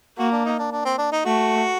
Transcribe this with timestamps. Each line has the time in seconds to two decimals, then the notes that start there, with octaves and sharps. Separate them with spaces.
0.18 A#3 F#4
0.32 D4
0.45 D#4
0.59 D4
0.72 D4
0.85 C4
0.98 D4
1.12 D#4
1.25 A3 F#4